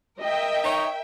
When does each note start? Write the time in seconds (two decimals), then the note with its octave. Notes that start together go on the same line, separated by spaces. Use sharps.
0.20 A#4 D#5 E5 G5
0.64 D#4 C#5